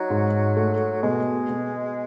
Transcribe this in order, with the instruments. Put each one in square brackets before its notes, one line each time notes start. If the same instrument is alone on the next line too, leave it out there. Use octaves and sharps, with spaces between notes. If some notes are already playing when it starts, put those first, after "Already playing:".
Already playing: [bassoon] F#3 [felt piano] D#4
[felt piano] G#2
A3
[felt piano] B2 [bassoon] G#3
[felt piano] B2